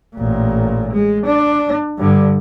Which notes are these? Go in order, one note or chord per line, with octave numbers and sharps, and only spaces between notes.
A1 A#2
G#3
D4
G2 D3